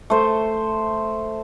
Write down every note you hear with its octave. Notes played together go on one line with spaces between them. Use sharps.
A3 C5